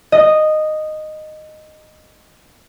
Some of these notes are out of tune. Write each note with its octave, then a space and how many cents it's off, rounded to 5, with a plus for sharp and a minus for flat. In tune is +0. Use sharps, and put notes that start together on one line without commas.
D#5 -10